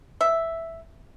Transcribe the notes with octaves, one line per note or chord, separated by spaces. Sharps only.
E5